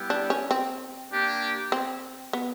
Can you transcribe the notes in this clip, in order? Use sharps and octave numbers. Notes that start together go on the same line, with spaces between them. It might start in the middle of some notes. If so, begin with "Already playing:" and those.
Already playing: G3 B3 E4 G4
D4
C#4
C4
A#3 D4 G4
C4
B3